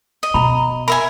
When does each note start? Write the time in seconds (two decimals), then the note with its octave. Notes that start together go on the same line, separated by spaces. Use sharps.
0.23 D#5
0.34 B2 A#5 B5
0.88 A#4 E5 G#5 B5